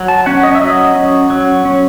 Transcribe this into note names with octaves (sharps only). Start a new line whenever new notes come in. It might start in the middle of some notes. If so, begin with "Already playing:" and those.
Already playing: F#3
A5
C#4 F#5
D#5
E5
F#3 D#5
C#4
F#3
C#4